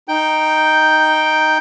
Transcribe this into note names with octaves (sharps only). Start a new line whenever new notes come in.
D#4 G5 G6